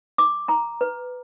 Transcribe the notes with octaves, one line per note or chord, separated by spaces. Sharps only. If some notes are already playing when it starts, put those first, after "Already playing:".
D6
A#5
B4